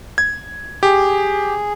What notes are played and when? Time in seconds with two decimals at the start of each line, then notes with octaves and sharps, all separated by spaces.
0.18 G#6
0.83 G4 G#4